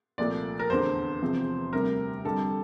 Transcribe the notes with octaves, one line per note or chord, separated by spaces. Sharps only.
C2 A#2 F3 A3 D5
A#4
F1 E2 D3 C5
E1 E2 C3 F3 C4
D2 C3 G3 A#4
F2 D3 G3 A4